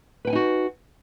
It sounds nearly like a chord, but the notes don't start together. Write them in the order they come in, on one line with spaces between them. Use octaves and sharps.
B4 G5 G#5 D#4 F#4